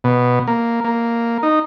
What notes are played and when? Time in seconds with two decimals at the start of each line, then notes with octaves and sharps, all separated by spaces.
0.04 B2
0.47 A#3
0.84 A#3
1.43 D#4